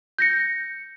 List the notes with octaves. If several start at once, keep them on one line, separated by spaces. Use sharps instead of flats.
G6 A#6 C#7